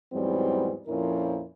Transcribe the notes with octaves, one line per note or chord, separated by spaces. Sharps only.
E2 G#2 E3 F#3 G3 C4
F2 A#2 F3 C#4 E4 A#4